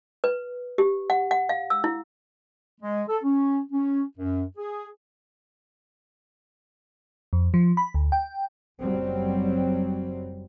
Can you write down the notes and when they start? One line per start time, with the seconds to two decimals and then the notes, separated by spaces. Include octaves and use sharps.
0.24 B4
0.78 G4
1.10 F#5
1.31 F#5
1.49 F5
1.70 E6
1.84 E4
2.81 G#3
3.08 A4
3.22 C#4
3.71 C#4
4.17 F#2
4.57 G#4
7.33 F2
7.54 F3
7.77 B5
7.94 D2
8.12 G5
8.81 F#1 F#3 G3 C4